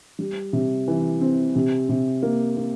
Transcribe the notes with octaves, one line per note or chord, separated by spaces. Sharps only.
G3
C3
E3
C4
C3
C3
A#3
A#3